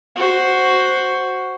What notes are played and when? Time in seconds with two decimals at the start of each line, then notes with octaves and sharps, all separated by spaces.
0.16 F#4 C5